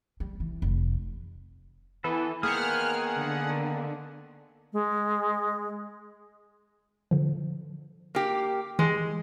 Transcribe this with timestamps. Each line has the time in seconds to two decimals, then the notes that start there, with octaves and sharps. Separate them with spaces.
0.20 G3
0.40 E3
0.62 F1
2.04 E3 B3 A4
2.43 D#3 A#3 B3 G#4 C5 F#5 F6 F#6
3.17 D3
3.49 D#3
4.73 G#3
7.11 D3 F3
8.15 A#3 G4
8.79 E3 G#3